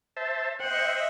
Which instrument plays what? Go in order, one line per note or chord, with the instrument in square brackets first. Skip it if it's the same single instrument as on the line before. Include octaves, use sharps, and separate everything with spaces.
[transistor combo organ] C5 E5 A5
[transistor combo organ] C5 G5 [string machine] D#5 E5 [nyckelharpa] F#5